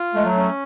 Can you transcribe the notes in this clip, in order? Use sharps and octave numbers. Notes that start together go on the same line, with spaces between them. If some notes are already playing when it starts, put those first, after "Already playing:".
Already playing: F4
G#3 A3
F#3
C#4